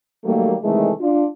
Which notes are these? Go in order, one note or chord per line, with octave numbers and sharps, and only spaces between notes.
D#3 F#3 G3 A3 A#3
C3 D#3 E3 G#3 A3
D4 F4